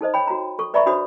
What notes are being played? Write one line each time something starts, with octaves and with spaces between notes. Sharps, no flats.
D#4 A4 C5 D#5
C#5 G5 B5
F#4 A#5
A4 C#6
B4 D5 E5 A#5 B5 C#6
D4 F#4 C5 C#5 B5 D#6